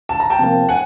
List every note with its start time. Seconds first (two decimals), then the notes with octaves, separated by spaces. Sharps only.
0.09 A5
0.20 A#5
0.30 G5 A5
0.39 C3 F3 A#3
0.69 F#5 G#5